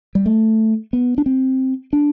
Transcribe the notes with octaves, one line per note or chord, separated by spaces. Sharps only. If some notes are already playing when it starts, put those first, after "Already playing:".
G3
A3
B3
D4
C4
D4